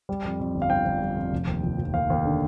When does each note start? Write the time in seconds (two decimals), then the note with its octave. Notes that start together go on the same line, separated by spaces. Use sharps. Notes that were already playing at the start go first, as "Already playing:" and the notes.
0.09 G3
0.24 F2
0.40 F2
0.55 G1
0.62 F5
0.70 G1 G5
0.86 G1
1.01 G3
1.17 F2
1.33 F1
1.47 D#2
1.63 F1
1.78 F1
1.94 D#2 F5
2.10 D#2
2.25 D3